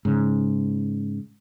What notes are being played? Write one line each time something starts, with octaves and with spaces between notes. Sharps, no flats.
G#2 C#3